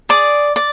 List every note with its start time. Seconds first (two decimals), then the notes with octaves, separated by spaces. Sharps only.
0.09 G#4 D5 D6
0.56 D5